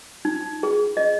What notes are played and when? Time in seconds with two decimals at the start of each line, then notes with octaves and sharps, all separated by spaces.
0.25 D#4
0.63 G#4
0.97 D#5